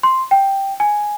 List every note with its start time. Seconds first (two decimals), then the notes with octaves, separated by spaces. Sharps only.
0.03 C6
0.31 G5
0.80 G#5